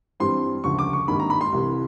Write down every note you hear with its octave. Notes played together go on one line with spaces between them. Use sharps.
G2 E3 G3 C4 C6
D2 C#3 F3 C#6
D6
C#6
G#1 G2 D#3 G3 A#3 B5
A#5
B5
C6
C2 C3 E3